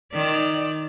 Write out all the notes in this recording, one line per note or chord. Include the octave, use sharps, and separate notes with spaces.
D#3 D5